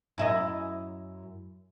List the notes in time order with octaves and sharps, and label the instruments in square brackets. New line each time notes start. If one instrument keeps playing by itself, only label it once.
[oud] F#2 E4 D#5